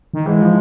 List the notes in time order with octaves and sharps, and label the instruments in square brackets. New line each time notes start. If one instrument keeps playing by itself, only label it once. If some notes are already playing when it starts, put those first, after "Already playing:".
[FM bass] D#3
[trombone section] G#2 G#3 [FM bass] E3
[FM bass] F3